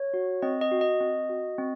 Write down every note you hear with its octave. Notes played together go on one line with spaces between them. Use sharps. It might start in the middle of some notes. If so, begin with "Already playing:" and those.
Already playing: C#5
F#4
C4 D#5
D#5
F#4
D#5
C4
F#4
C4